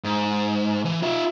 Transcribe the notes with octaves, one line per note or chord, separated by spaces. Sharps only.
G#2
E3
F4 E5